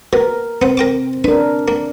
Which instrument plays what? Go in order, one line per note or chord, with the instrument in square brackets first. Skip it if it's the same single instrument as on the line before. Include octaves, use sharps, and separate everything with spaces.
[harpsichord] B2 [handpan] A#4
[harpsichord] B3 C5 [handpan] C4
[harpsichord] A#4 G5 D6
[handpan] D4 A#4 [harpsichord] B4
[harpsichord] A#3